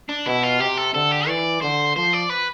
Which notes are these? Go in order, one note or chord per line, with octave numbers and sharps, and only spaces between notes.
D4
B2 E4
F4
C3 G4
A4
D3 A4
G4
E3 D5
D3 C5
F3 C5
D5
B4